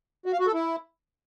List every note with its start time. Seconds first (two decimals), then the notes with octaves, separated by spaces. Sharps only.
0.26 F#4
0.33 F5
0.40 F#4
0.47 A4
0.54 E4